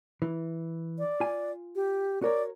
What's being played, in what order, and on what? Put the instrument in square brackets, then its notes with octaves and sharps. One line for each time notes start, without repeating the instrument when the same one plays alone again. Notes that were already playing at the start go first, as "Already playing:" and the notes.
[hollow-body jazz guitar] E3
[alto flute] D5
[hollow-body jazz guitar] F4 G#5
[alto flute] G4
[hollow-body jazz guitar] F#4 A#4 C#5 [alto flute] D5